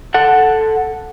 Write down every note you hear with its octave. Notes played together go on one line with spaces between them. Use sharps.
A4 F#5